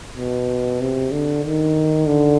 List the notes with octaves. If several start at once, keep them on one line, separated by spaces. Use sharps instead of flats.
B2
C3
D3
D#3
D3